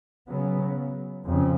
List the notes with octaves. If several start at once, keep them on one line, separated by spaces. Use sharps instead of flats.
C#3 F#3 B3
F2 C#3